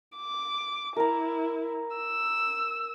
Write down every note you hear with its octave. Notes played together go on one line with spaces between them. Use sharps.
D6
E4 A#4 A#5
E6